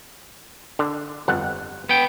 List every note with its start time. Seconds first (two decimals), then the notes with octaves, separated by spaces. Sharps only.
0.79 D3
1.28 G1 F2 F#5
1.89 B3 G5